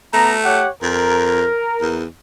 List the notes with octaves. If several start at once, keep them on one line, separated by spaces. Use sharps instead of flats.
A3 B3 A#5
G4 C#5 F#5
F2 A#4
E2